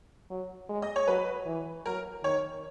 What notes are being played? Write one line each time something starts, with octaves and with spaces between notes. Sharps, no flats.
F#3
G#3
D#5
C#5
F#3 B4
E3
F#3 A#4
D#3 C#5